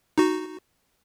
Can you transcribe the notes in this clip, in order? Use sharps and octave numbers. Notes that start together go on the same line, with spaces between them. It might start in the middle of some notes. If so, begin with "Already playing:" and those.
D#4 F#4